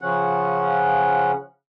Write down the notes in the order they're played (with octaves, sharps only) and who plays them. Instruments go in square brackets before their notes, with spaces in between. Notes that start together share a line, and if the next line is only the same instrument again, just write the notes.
[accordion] C#3 F3 C#4 F#5